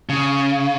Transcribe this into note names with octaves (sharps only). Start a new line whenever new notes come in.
C#3